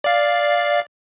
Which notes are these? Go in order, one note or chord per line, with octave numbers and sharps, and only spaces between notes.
D5 F5